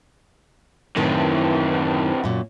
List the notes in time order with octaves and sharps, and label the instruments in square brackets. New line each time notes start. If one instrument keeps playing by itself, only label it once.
[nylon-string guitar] F#2 A2 D#3 [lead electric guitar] C3 E3
[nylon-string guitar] F#2 A#2 F#4